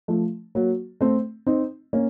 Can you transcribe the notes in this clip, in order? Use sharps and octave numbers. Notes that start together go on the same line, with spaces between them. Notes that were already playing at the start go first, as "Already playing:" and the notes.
F3 A3
F#3 A#3
A3 C4
C4 D#4
A#3 C#4